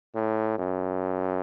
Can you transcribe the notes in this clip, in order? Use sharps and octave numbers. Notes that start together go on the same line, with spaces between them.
A2
F#2